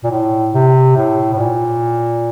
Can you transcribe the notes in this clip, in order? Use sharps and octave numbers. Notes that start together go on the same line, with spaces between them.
A#2
A2
C3
A2
A2
A#2